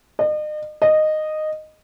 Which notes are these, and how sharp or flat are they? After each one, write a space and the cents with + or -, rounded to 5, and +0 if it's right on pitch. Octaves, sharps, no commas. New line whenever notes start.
D#5 -40
D#5 -10